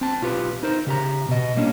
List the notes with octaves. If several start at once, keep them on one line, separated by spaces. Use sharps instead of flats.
C4 A5
B1 F4 G4 B4
D#4 A#4 C5
C#3 G4 A#5
B2 D#5
G3 A#3 C#4 D4